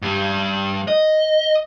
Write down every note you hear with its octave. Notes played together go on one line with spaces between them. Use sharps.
G2 G3
D#5